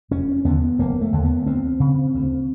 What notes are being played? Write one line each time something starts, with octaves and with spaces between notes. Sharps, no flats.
F1 C#4
D#2 D3 B3
F1 A#3
A3
D#2 D3
B3
D2 C4
C#3
D2